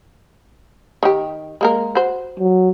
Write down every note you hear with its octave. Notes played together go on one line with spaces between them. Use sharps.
D#3 G4
G#3 A#3 A#4
F#4 C5
F#3